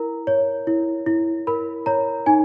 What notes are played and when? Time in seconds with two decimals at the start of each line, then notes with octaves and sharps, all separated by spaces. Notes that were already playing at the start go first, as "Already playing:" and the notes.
Already playing: E4 A#4 A#5
0.27 C#5
0.67 E4
1.06 E4
1.47 A#4 B5
1.86 C#5 A#5
2.26 D#4 G#5